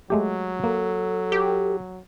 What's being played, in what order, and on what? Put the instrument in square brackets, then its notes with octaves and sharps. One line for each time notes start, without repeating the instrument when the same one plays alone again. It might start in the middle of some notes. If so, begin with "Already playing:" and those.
[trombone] F#3 [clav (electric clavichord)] G#3 A3 G4
[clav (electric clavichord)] A#3 [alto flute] A4
[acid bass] G4